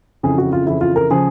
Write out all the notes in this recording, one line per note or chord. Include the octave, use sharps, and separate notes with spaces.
F2 C#3 E3 G#4
F#4
F4
F2 C#3 E3 E4
F4
A#4
C#3 F3 G#4